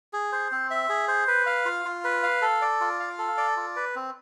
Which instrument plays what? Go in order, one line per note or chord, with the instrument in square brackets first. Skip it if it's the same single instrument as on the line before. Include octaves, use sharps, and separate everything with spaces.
[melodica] G#4
C5
C4
E5
G#4
C5
B4
F5
F4
F4
B4
F5
A4
D5
F4
F5
A4
D5
F4
B4
C4